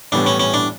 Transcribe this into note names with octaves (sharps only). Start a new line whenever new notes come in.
A2 E3 G3 B3 D4
C#4
C#4
D4